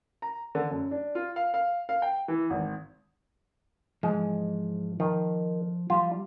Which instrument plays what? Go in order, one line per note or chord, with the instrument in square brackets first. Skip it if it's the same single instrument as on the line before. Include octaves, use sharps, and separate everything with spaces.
[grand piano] A#5
D3
F#2
D4
F4
F5
F5
F5
G5
E3
G#1
[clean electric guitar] G#2 E3 F3 [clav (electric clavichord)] G#3
[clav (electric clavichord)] D#3 [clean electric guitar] F3
[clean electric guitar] F3 G3 [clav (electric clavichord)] F4